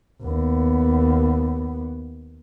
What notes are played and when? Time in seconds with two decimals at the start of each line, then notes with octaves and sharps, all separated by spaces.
0.23 D#2 B3